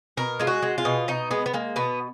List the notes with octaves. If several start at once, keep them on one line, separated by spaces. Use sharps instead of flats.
B2 A#4
G#3 F4
F#4
G#3
F4
B2
B2 D#4
G#3 B3
B3
G#3 A#3
B2 B3